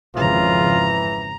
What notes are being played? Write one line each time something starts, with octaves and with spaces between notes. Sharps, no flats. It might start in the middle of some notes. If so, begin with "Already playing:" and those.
G#1 F2 C#3 E3 F4 A#5